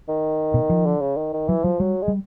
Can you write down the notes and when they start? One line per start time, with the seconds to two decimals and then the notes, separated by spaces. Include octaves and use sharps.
0.08 D#3
0.54 B2
0.70 F3
0.86 D3
1.01 C#3
1.17 D#3
1.33 D#3
1.48 E3 F#3
1.64 F3 F#3
1.80 F#3 G3
2.02 G#3
2.08 G3